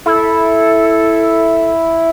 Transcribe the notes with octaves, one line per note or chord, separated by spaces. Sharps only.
E4 A4